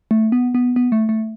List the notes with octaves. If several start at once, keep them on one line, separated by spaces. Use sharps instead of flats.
A3
B3
B3
B3
A3
A3